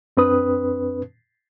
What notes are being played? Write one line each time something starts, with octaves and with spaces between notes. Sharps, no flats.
F#2 C4 D4 B4 D#6